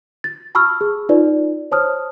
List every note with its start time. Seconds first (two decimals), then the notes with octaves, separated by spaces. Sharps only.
0.24 A6
0.55 A5 B5 C#6 E6 F6
0.81 G#4
1.09 D#4 F4 B4 D5
1.71 C5 C#5 A5 D#6 F6